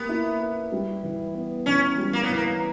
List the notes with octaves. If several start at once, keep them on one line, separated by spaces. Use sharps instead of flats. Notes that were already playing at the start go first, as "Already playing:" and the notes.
Already playing: A#3 B3 G4
E4
B4
G3
E3
B3
E3 C#4
G3
A#3
B3
E3 A#3